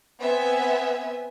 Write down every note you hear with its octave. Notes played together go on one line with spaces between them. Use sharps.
B3 C4 E5 G#5